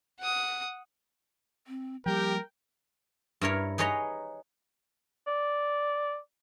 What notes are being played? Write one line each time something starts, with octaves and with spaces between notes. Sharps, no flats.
F#5 D#6
C4
F3 G3 A#3 G4 A#4 G5
G2 E4 A#4 C#5
D#4 G#4 B4 C#5 D#5 A#5
D5